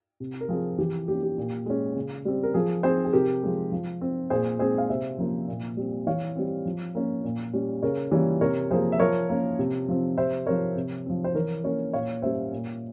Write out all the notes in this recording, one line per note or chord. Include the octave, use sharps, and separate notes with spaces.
C3
A#4
F3 C4 G#4
E3 G4
A#3 C#4 G4
G4
A#2
G#3 C#4
C#3
G3 C4
A#4
F3 G#4
C4 G#4 C5
G#4
C3 G4 A#4
F3 G#3
F3
C4
A#2 G#4 C5
G#3 C4 G#4 C5
F5
C3 C5 E5
F3 A#3 C#4
A#2
G3 C4
E3 C#5 F5
G3 C4
F3
A#3 C#4
A#2
G3 C#4
C#3 A#4 C#5
E3 G3 A#3 C#4
C3 A#4 C#5
F3 A#3 G#4 C5
E5
F3 A#4 C#5
A#3 C#4
C3
F3 C4
C3 C5 E5
F3 C4 A#4 C#5
C3
F3 C4
C5
E3 A#4 C#5
A#3 C#4 A#4 C#5
A#2 C#5 F5
G3 A#3 C#4 C5 E5
A#2